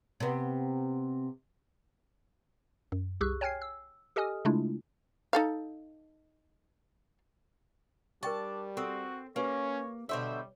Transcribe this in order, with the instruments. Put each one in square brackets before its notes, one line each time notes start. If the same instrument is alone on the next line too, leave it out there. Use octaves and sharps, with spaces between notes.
[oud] C3 B3
[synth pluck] F#2
C2 G4 G#4 C#6 E6 F#6
C#5 G5 G#5 F6 G#6 C7
E6
G4 A4 D#5 G#5 D#6 F6
C#3 G#3 A3 D4 E4 F4
[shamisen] D#4 A4 F5
[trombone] G3 [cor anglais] D4 [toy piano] A#4 G5 C#6 [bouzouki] A5
[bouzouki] C4 [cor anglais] F#4 [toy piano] A4 E6
[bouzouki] A#3 [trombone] C#4 [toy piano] G4 B4 [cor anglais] C#5
[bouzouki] B2 C5 E5 [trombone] D3 [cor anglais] G3 [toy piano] C#5